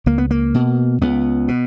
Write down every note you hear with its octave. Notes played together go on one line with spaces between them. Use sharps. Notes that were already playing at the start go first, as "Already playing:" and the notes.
C#2 A#3
B3
A#3
B2
C#2 B3
B2